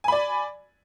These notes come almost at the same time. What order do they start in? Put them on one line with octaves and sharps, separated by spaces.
G#5 B5 D5